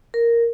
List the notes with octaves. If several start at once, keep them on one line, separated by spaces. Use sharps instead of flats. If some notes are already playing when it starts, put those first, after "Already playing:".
A#4